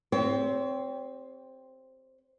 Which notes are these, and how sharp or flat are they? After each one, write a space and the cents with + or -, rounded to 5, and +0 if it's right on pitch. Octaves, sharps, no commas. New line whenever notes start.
C4 +0 G4 +0 C#5 +35